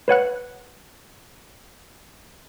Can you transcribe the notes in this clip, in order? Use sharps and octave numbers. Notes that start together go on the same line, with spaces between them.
B4 C#5 F#5 F#6